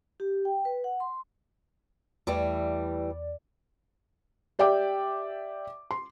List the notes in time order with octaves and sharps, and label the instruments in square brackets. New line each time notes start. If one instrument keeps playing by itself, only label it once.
[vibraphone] G4
G5
B4
F#5
C6
[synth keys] E2 D5 [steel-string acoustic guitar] E3 G3 A3
[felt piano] G4 D5 E5 G5 D6
C6